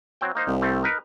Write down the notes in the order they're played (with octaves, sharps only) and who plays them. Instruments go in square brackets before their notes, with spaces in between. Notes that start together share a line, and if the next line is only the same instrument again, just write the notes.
[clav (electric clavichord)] F#3 C4 G5
A#3 D#4 C5
[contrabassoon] C2
[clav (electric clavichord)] G3 A3 C4
D#4 A#4 B4